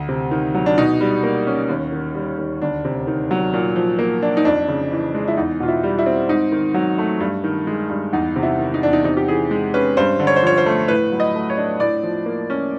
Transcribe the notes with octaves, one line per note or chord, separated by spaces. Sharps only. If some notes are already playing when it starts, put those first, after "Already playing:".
Already playing: D2
C3
D#3
F#3
D4
B2 D#4
G3
A#3
C#4
D#2
D#3
G3
D#2
D2 D4
C3
D#3
F#3
A#2
F3
A#3
D4
D#4
F2 D4
C#3
E3
G#3
E4
E2 D#4
B2 F4
E4
G3
E4
C4
G#2 D#4
D#3
F#3
A3
G2
D#3
G#3
G2
E2 D#4
C3
E4
D#3
D#4
E2 D4
D#4
C3 D#4
G4
E3 G#4
G#3
C#4 B4
G2 C5
D3
C#5
C5
F3 C#5
C5
A3
A2 B4
F#3
D#5
A3
C#5
D4
A2 D5
F3
A#3
C#4